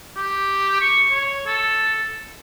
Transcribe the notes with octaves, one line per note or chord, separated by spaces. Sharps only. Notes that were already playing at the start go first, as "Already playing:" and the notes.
G4
C#6
C#5
A4